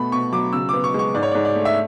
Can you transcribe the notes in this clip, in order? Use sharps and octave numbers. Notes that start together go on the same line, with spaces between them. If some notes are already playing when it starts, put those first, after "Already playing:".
Already playing: B2 A3 B5
B2 C#6
F#3 D6
C#3 E6
B3 D6
C#6
G#3 C#6
G#2 D5
C#5
G#2 D5
D5
A3
E5